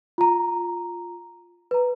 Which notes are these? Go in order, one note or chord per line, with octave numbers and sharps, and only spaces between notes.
F4 A#5
B4 A#5